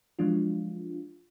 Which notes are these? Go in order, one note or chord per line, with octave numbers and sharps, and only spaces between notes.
F3 F#3 G#3 D4 F4